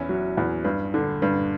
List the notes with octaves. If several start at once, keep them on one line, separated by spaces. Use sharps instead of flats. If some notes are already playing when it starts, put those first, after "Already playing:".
Already playing: E2 C#4 E4
F#3
E2
G2
D3
G2